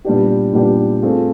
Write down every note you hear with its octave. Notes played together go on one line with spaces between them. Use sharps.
A#2 G3 B3 D4 G4
A#2 G3 B3 D4 G4
A3 C4 F4 G#4